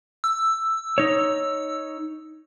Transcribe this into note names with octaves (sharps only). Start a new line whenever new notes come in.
E6
D#4 C#5